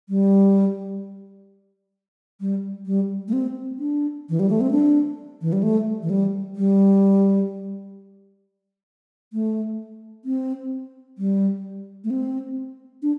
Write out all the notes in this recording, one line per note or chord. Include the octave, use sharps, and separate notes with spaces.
G3
G3
G3
A3
C4
D4
E3
G3
A3
C4
D4
E3
G3
A3
E3
G3
G3
A3
C4
G3
A3
C4
D4